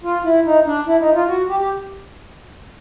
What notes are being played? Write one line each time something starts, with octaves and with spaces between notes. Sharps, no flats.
F4
E4
D#4
D4
E4
D#4
F4
F#4
G4
G4